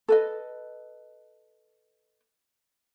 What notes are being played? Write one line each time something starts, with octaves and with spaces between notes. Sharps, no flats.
A4 B4 D#5